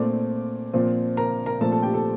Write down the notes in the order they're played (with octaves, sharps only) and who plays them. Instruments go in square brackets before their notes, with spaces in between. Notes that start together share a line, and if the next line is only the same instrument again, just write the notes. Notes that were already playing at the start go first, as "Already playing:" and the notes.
Already playing: [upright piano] A#2 A3 C4 D5 D6
A#2 F3 C4
A#4 A#5
A#4 A#5
A#2 F3 A3 C4 A4 A5
A4 A5
G4 G5
A4 A5